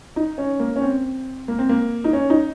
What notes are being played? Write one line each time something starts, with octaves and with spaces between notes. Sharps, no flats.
D#4
C#4
A#3
C#4
C4
A#3
C4
A#3
D#4
C#4
D#4